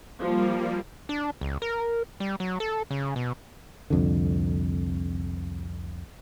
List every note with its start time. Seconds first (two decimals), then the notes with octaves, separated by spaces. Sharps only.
0.19 F3 G3 A#3
1.09 D4
1.41 C#2
1.62 A#4
2.20 G3
2.40 F#3
2.60 A4
2.91 C#3
3.16 B2
3.90 C2 F2 D3